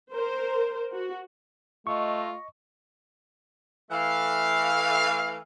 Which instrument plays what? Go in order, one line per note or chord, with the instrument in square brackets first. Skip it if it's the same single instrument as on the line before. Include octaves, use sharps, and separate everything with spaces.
[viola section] A#4 C5
F#4
[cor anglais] A3 [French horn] F4 [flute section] D#5 [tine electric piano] C#6
[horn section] E3 A3 F5